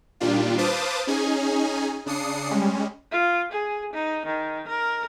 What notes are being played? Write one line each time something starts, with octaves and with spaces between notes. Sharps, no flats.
A#2 D#3 G3 D4 F4
B4 C5 F5 A5 D6 D#6
C#4 D#4 G#4 G#5
C#3 D4 D#6 C7 C#7
G3 G#3 C#4
F4
G#4
D#4
D#3
A#4